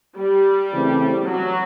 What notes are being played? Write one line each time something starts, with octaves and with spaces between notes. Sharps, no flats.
G3
C#3 E3 A3 C4
F#3